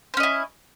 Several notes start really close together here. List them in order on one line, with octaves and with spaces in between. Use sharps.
C5 C#4 D#5 E4